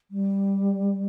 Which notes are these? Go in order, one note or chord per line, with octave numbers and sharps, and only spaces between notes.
G3